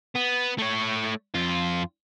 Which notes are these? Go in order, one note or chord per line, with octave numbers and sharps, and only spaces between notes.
B3
A3 C#5
F2 F4